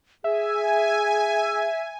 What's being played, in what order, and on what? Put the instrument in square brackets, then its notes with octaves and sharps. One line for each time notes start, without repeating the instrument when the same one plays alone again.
[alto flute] G#4 [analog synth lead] E5 [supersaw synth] G#5